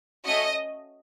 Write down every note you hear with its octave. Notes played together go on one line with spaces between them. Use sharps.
A3 C#4 F#4 D#5